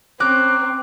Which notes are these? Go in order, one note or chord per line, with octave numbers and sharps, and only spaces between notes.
C4 C#4 A#5 D6 F#6